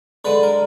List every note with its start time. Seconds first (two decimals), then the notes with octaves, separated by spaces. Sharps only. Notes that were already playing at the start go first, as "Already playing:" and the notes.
0.25 D3 G#3 B4
0.43 A#4